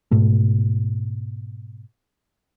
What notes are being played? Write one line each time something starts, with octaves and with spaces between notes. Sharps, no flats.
G#2 B2 A3